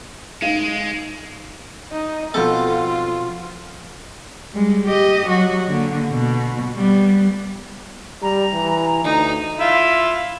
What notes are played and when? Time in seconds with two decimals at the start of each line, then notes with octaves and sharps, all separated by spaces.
0.42 G#3 D#4 F5
1.92 D#4
2.34 B2 F3 C4 F4 A4
4.52 G3 G#3
4.85 G4 D#5
5.26 F#3 F#4
5.67 D3 A#3
6.10 B2
6.75 G3 B3
8.22 G3 A#5
8.53 E3
9.05 D2 D#4
9.60 E4 F4